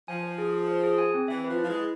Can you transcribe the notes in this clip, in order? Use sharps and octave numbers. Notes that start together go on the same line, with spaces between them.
F3 G#5
C5
G#4
G#4
C5
G#4
G#5
C4
E3 E5
F3 B4
E4
F3
G#3
E4